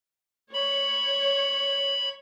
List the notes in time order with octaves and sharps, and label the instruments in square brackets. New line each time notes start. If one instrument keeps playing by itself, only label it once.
[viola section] C#5 [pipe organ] B5